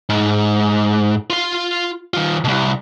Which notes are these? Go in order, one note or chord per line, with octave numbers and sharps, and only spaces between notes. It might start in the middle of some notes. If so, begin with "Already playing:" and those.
G#2
F4 C6
D#3 F4
C2 B2